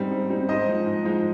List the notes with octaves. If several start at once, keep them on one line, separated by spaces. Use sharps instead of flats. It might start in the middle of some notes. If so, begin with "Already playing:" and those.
Already playing: G#2 G3 C4 D#4
G#2
G3 C4 D#4
G#2 C5 D#5
F3 G#3 D#4
G#2
F3 G#3 D#4